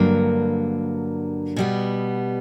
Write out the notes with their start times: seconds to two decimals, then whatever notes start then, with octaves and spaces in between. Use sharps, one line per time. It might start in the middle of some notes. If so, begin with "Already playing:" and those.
Already playing: G2 D3 F#3 A#3
1.56 B2 G3 B3